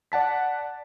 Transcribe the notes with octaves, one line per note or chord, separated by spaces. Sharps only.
D5 F#5 A5 B6